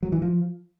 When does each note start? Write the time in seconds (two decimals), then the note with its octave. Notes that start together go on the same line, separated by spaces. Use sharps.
0.03 F#3
0.12 E3
0.22 F3